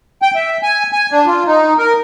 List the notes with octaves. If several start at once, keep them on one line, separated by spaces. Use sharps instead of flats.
G5
E5
G#5
G#5
D4
F4
D#4
A#4